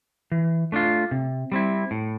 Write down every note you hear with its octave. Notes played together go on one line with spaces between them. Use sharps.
E3
A3 D4 F4
C3
G3 C4 E4
A2